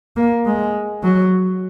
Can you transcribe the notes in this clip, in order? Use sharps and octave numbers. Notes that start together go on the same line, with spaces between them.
A#3
G#3
F#3